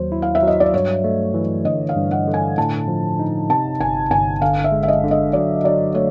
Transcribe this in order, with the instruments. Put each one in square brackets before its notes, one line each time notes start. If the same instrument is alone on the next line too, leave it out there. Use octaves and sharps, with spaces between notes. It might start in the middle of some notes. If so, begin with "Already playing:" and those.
Already playing: [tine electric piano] D#2 F#3 [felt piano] C5
[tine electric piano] E4
[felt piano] F5
E5
[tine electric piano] F#3
[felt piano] D#5
D5
[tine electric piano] G2 [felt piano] C#5
[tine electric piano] A3
E3
[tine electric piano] D3 [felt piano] D#5
[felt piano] F5
[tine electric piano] G2
[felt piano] F#5
[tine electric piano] D3
[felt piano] G#5
[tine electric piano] A2 [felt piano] A5
[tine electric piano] F3
D#4
[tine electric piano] C3 [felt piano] A5
[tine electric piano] G1 [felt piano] G#5
[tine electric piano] G1 [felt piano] G#5
[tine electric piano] D3 [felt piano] F5
[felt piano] E5
[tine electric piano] G#3
[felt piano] E5
D#5
[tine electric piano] D3
[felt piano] D#5
[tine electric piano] F#3 [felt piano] D5
[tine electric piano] F#3 [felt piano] D5
[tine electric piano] A3 [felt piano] C#5